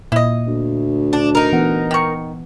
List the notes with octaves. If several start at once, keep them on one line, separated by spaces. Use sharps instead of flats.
A#2 E4 D#5
D2
D4
D#4 A#4
E3 B3 F#5
D#3 C#6